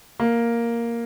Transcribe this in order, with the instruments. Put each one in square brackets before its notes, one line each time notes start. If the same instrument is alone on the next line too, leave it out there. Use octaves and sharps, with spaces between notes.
[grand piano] A#3